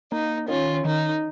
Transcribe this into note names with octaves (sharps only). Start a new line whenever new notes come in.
A#3 D#4
D#3 C#4 F4
D#3 D#4